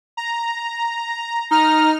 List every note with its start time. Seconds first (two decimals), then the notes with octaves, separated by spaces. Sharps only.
0.17 A#5
1.51 D#4 A#5 F6